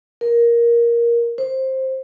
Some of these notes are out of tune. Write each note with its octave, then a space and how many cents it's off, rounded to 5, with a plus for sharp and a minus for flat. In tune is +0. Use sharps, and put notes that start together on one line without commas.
A#4 +10
C5 +15